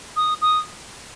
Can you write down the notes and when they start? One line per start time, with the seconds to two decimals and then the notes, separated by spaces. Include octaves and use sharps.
0.16 D#6
0.42 D#6